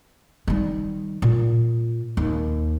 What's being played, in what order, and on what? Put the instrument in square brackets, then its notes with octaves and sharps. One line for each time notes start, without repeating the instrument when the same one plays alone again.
[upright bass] D#3 G3
A#2
D#2